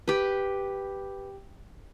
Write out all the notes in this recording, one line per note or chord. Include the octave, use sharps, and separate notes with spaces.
G4 B4